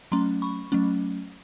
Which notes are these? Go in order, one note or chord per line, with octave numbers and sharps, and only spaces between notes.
F#3 A3 C#4 A#5 C6
B5 C#6
F#3 A3 C#4